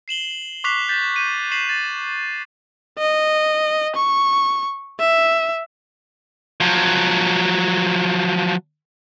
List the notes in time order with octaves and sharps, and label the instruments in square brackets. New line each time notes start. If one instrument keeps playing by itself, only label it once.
[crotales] C7 E7 F#7 G7
C#6 D6 F#6 B6 C7 F7
G6 A6 B6
G6 D#7
C#6 B6 C7 E7 F#7
A6
[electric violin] D#5
C#6
E5
[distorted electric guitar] F3 F#3